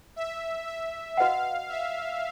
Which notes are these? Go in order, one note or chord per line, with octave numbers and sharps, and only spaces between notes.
E5
E5
F#4 B4 D#5 F5 F#5
E5